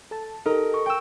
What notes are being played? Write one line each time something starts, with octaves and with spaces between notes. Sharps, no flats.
A4 A5
D#4 G4 A4 A#4
C#6
G5 E6